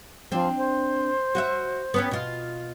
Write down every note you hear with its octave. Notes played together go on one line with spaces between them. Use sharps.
F3 C4 D4
C5
F#4 D#5 E5
B3 C#4 G4
B2 F4